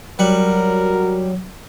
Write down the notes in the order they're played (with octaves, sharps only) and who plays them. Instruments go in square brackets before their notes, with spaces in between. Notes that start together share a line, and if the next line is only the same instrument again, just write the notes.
[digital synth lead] F#3 [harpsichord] G3 F#5 [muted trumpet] A#4